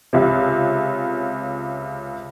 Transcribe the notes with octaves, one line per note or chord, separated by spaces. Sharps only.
C#2 C3